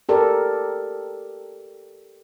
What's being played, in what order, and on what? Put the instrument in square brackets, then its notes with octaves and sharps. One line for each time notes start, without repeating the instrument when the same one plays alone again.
[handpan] G4 A4 A#4 D5